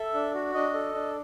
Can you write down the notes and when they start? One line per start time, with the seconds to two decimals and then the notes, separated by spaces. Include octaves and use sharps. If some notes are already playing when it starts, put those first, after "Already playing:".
Already playing: A4 E5
0.14 D4
0.34 F#4
0.54 D4 D#5
0.74 A4
0.95 D4